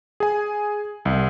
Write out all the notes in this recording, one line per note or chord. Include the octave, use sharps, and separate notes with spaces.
G#4 G#5
C2